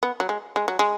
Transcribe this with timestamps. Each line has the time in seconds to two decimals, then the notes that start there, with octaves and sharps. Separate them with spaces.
0.03 B3
0.20 F#3
0.29 G#3
0.56 G#3
0.68 F#3
0.79 G#3